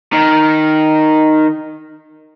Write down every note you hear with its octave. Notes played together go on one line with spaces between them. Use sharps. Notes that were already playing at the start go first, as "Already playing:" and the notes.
D#3